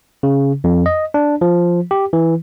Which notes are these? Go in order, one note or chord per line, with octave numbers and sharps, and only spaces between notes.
C#3
F2
D#5
D4
F3
G4
E3